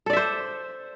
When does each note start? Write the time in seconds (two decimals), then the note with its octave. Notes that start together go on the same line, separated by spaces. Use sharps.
0.06 A4
0.10 D5
0.13 E5
0.17 C5